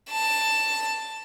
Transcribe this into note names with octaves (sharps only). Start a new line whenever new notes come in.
A5